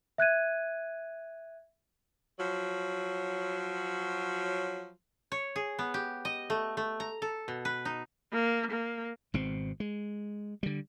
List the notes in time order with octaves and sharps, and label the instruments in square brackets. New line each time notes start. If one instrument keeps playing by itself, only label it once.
[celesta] E5 F#6 G#6 D#7
[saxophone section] F3 F#3
[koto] C#5
G#4
B3
G4
D#5
A3
A3
A#5
A4
B2
B4
D#4
[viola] A#3
A#3
[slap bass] G#1 B2 C4
G#3
D3 G3